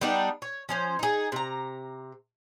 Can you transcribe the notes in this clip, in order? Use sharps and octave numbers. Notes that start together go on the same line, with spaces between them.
G3 B3 D4 D#4
C#5
F3 C#4 C5
D#4 G#4
C3 A#5